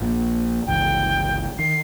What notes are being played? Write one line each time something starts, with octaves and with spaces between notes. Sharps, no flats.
A#1 A#2
G1 C#2 E3 G5
D#3 C7